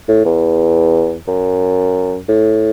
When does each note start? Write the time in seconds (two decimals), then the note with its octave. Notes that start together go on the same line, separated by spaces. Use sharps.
0.08 A2
0.25 E2
1.28 F#2
2.29 A2